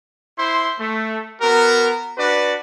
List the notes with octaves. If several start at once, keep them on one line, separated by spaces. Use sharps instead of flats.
E4 C5 C6
A3
B3 F#4 A#4
D4 F#4 B4 D5